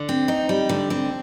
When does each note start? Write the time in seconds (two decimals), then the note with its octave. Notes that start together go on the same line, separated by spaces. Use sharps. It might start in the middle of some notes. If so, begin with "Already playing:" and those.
Already playing: D3
0.09 C4
0.28 D#4
0.49 G3
0.69 D3
0.90 C4